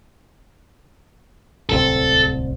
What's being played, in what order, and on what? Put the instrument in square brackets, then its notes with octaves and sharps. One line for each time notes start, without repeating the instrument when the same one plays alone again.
[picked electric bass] D1 C2 C4 [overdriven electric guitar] A4